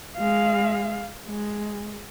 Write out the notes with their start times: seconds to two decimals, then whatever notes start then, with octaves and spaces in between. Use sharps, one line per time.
0.17 G#3 F5
1.27 G#3